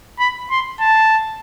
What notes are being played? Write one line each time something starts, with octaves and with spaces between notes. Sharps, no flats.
B5
C6
A5